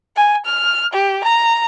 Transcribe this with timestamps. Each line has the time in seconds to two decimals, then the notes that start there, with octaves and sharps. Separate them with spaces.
0.16 G#5
0.45 F6
0.93 G4
1.24 A#5